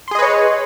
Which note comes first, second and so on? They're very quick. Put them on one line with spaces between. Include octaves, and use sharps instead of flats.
C6 G#4 D#5 B4 C#5